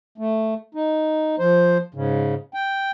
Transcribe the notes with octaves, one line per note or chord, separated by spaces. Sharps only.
A3
D#4
F3 C5
G#2 C#3
G5